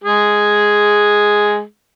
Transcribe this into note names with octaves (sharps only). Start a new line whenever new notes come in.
G#3 G#4